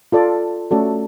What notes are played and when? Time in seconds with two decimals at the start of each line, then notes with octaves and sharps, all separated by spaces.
0.12 F4 A4 D5
0.71 A3 C#4 F#4 A4 D5